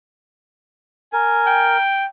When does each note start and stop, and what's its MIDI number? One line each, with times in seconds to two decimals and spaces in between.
1.13 1.77 70
1.13 1.74 80
1.47 2.06 79